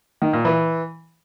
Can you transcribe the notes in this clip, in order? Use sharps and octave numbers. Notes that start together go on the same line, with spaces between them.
D#3
A#2
E3